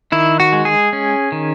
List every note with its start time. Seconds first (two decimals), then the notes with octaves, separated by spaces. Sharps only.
0.12 D#3 E4
0.40 F#4
0.53 G#3
0.65 G#4
0.93 C#4
1.32 D#3